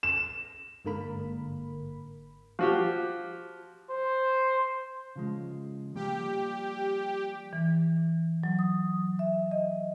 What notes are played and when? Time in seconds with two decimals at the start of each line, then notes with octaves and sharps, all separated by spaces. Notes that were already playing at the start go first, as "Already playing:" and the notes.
0.03 E7
0.85 G1 G#2 D3 A#3 A#4 B5
2.59 F3 F#4 G4
3.90 C5
5.16 C#3 F3 G#3
5.95 F3 G3 A#3 G4
7.53 E3
8.44 F#3
8.59 D#6
9.19 E5
9.51 D#5